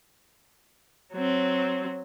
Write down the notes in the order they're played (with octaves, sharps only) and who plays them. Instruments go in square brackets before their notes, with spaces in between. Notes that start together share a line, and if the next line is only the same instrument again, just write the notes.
[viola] F#3 C4